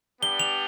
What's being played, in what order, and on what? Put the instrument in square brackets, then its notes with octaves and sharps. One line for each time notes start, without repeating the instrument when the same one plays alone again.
[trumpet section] G3 B3 D4 G4 [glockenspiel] G7
[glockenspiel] F7